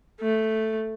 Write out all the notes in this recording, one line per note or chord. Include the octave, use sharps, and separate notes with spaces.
A3